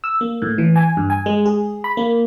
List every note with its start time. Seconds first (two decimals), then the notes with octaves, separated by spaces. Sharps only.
0.04 E6
0.21 A#3
0.42 A2
0.58 E3
0.76 G#5
0.97 G2
1.10 G#5
1.26 G#3
1.46 G#4
1.84 B5
1.97 A#3